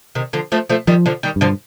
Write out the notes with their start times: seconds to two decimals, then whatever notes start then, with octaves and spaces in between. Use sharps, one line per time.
0.15 C3 D#3
0.33 D3 F3
0.52 F3 A3
0.69 F3 A3
0.87 D#3 F3 G3
1.06 D3 F3
1.23 D#3 G3
1.36 G2
1.41 D3 F3